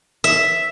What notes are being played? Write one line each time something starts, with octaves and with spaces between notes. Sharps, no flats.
E5